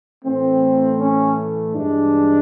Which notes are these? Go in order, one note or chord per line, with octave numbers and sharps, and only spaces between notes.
A2 E3 A3 C4
C#4
G2 E3 G#3 D4